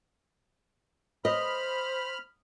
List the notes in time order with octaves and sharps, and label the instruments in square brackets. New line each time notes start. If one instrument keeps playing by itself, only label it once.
[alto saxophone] C5 [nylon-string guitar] D#5 [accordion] B5 F6